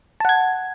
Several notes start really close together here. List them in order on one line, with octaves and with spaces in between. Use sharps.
A5 F#5 G#6